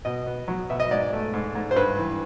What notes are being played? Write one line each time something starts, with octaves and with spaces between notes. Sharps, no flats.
B2 D#5
B3
F#3
B2 E5
D#5
G#2 D5
A3
G#2
G#2
C5
G2 B4
E3